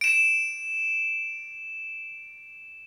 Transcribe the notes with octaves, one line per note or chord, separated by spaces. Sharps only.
D7 E7